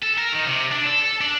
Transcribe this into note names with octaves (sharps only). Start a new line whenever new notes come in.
A4
A#4
D#3
C3
D4
A4
A4
D4